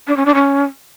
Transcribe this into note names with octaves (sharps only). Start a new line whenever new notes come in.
D4
C#4
D4
C#4